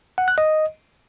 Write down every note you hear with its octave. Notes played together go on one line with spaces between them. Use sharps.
F#5
F#6
D#5